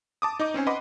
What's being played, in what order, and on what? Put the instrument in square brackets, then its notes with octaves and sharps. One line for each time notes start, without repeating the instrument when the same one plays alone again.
[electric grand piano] A5 D6 D#6
D#4 D#5 D6
C4 C#4 C5 G#5
B4 D#5 F#5 B5 C6 D6